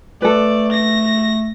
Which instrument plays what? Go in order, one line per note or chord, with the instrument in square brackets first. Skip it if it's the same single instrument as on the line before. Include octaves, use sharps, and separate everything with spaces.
[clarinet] A3 [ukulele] A4 B4 [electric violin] D5
[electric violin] A#6